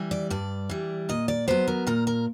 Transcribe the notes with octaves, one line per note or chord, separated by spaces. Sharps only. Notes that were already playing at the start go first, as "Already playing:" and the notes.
Already playing: E3 G3
D5
G2 D5
E3 G3
A#2 D#5
D5
F#3 B3 C5
A#4
A#2 A#4
A#4